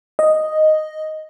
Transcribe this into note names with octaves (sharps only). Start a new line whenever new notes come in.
D#5